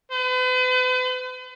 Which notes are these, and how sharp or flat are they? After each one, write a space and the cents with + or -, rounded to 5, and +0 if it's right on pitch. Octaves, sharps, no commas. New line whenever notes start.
B4 +45